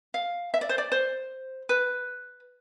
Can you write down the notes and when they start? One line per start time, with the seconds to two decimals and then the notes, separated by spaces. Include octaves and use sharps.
0.14 F5
0.54 E5
0.61 D5
0.69 C5
0.78 D5
0.92 C5
1.69 B4